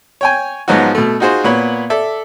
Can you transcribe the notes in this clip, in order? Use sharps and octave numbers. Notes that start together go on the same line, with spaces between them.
C#5 G5 G#5
G#2 F3 F#3 B3 D#4 F#4
B2 A3
D#4 F4 F#4 G#4 C5
A#2 B3 C#5 B5
A4 D5 E5